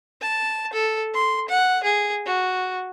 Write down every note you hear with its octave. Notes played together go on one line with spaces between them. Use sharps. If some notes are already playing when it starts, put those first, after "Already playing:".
A5
A4
C6
F#5
G#4
F#4